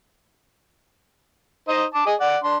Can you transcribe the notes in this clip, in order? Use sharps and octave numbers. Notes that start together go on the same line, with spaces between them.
D#4 C5 D#5
A5 D6
G#4 D#5
D5 F#5
D4 C6